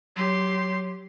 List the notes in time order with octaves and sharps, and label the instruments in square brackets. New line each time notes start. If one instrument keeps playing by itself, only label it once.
[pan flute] F#3 [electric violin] G4 C6